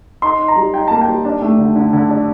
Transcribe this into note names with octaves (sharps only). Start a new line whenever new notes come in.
D#4 C6
D#4
A#5
G3
D#4 G5
A#3 A5
G5
G3
D4
A3
D3
D3
D3
D4